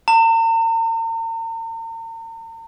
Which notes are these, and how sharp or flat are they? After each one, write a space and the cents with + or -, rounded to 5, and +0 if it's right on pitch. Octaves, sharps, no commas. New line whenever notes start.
A#5 -45